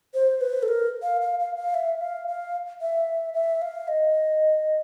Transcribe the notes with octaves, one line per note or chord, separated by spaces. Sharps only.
C5
B4
A4
A#4
F5
F5
F5
F5
E5
F5
F5
E5
E5
F5
D#5